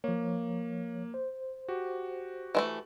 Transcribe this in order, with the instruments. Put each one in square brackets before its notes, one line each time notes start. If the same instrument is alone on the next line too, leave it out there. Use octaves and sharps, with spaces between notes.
[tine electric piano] F3 C#5 [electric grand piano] A#3
[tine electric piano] C5
[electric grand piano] F#4 G4
[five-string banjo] E3 G#3 A3